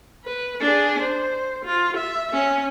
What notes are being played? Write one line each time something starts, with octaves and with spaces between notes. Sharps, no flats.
B4
D4 G#4
C5
F4
E5
C#4